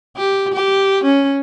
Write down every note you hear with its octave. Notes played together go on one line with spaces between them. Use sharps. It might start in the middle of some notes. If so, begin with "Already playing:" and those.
G4
G4
C#4